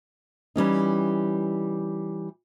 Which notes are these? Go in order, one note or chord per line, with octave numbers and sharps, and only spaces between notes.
E3 G3 C#4 D#4